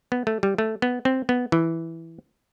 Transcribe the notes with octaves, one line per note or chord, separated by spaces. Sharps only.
B3
A3
G3
A3
B3
C4
B3
E3